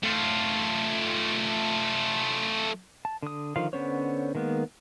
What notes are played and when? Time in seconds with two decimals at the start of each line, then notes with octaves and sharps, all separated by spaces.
0.03 A3 F4
3.05 A5
3.23 D3 D#6
3.56 D3 D#3 F3 F4 F5
3.73 D3 B3 C#4 C5 C#5
4.35 D#3 G#3 A#3 B3